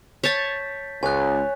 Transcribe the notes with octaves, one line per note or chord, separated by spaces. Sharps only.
C#5 A5 G6 A6 B6
C#2 C#5 G#5 F#6